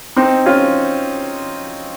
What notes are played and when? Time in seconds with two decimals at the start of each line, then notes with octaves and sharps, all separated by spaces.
0.16 C4 D#4
0.46 C#4 F4